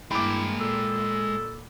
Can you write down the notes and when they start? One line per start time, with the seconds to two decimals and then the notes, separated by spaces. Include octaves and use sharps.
0.11 G2 G#3 A#3 E4 G5 B5 D6
0.60 A#2 A4